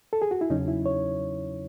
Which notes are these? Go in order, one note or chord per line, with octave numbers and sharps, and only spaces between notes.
A4
G#4
F#4
E4
E2 C#3 F#3 C#4 D#4
E4
C#5